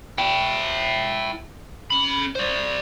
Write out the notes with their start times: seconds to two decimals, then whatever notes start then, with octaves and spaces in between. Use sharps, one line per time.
0.18 E4 G5
1.90 C#4 B5
2.35 C5 D5